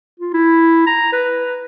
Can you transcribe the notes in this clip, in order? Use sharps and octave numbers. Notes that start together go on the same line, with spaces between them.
F4
E4
A#5
B4